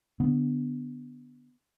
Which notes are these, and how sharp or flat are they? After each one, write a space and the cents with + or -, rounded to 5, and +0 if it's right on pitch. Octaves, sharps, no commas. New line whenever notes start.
D3 +0 B3 +0